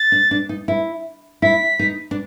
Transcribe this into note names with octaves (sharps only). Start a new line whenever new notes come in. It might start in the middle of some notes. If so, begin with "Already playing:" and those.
Already playing: A6
D4
D4
D#4
E4
E4 B6
D#4
D4